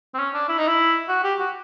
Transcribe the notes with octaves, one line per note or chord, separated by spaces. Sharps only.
C4
C#4
D4
E4
D#4
E4
F#4
G4
F#4